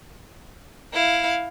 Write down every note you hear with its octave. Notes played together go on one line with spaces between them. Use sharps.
E4 F5